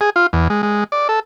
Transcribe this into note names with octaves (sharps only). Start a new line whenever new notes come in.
G#4
F4
E2
G#3
G#3
D5
A4